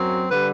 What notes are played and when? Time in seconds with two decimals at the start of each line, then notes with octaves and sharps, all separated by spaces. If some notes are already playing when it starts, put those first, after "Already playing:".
Already playing: F#2 F#3 C4
0.30 D3 G3 B4